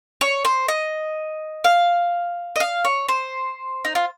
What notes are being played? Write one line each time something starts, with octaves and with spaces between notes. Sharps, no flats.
C#5
C5
D#5
F5
D#5
F5
C#5
C5
D#4
F4